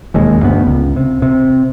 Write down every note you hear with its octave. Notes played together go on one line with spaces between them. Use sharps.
E1 D#2 G#3
D2 G2 B3
C#2
C3
C3